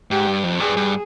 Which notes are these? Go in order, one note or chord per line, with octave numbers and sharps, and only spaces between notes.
G#2 G4
G2
F2
G2 G#4
G2